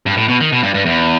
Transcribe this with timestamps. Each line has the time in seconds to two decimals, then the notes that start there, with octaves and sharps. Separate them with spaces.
0.06 G2
0.17 A2
0.28 B2
0.41 D#3
0.52 B2
0.63 G2
0.74 G2
0.86 E2